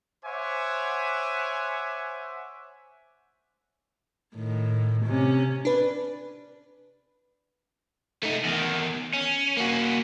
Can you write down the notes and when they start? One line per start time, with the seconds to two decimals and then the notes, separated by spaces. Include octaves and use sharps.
0.26 C5 C#5 E5 F#5 G#5 D6
4.36 A2 D#3
5.05 C3 C#4
5.65 D4 B4
8.23 A3 D#4
8.44 E2 D#3
9.13 C#4
9.57 A#3 F#4